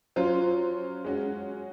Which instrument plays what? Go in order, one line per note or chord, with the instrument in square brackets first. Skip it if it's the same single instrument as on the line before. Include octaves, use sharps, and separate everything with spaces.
[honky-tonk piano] F#3 C#4 F4 C5
G#3 C#4 F#4